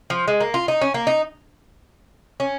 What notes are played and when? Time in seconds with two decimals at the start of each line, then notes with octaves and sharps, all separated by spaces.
0.10 F3
0.28 G#3
0.40 A#3
0.54 F4
0.68 D#4
0.81 C#4
0.94 A#3
1.07 D#4
2.40 C#4